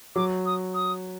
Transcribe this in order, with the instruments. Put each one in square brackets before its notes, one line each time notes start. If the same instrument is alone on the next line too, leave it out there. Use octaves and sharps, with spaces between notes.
[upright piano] F#3 [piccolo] D6
[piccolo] D#6
D#6